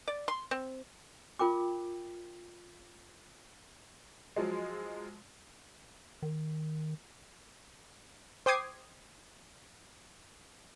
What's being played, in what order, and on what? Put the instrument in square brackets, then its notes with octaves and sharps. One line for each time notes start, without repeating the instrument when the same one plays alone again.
[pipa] D5
C6
C4
[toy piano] F4 A#4 G5 D6
[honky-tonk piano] F3 F#3 G#3
[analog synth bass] D#3
[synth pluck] C5 G5 D6 D#6 G#6 C7